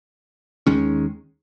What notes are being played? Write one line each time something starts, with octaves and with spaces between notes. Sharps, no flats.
D#2 D#3 G#3 C#4